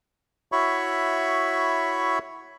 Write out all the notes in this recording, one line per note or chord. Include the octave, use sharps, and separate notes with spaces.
E4 F#4 C#5 E5 B5 C#6